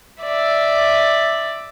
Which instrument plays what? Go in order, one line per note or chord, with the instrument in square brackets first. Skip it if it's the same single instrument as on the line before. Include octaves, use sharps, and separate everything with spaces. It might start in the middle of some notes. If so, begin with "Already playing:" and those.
[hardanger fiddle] D5 E5